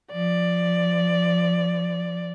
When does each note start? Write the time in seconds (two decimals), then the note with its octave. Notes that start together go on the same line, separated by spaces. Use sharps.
0.12 F3 D5